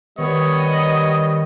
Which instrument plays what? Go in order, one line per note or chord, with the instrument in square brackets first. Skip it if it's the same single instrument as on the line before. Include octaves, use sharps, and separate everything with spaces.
[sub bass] D#3 [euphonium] G3 [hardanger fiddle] B3 C#5 [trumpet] D#5